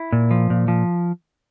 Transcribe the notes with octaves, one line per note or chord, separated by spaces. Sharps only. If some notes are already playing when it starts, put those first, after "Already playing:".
Already playing: E4
A#2
F3
A#2
F3